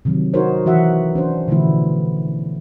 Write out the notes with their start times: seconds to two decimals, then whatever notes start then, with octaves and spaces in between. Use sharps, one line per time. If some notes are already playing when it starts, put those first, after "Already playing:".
0.05 C3 D#3 F#3
0.33 D#4 F#4 A#4 C5 C#5
0.66 E3 F#4 E5 F#5
1.15 C#4 D4 C5
1.48 B2 D3 E3 F3 A3 E4